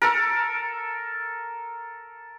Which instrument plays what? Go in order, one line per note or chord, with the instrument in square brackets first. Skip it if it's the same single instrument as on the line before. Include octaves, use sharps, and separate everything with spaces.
[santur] A4 A#4